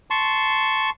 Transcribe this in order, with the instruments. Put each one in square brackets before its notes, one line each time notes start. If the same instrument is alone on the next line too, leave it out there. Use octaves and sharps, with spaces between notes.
[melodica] A5 C6 C#6